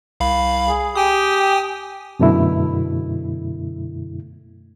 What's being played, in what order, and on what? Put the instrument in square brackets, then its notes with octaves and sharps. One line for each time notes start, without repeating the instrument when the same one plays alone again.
[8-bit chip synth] C2 F5 B5
[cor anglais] G#4
[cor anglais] G4 [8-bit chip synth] G5 G#5 D#6
[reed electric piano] F#2 B2 D3 A3 E4